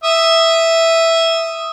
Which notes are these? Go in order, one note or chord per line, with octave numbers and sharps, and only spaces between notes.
E5 D#6